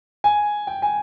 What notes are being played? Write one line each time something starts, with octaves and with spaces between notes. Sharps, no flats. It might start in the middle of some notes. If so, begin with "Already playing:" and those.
G#5
G5
G#5